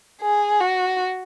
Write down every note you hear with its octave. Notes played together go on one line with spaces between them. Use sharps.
G#4
F#4